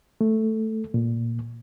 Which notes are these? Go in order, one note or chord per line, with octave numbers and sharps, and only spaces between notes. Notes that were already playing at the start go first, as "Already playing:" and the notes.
A3
A#2